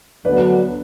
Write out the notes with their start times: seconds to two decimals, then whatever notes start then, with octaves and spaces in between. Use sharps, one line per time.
0.25 D2 D3 F#3 B3 D4 B4 D5